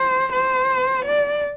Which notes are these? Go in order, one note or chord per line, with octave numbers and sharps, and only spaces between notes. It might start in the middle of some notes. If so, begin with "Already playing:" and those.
Already playing: C5
C5
D5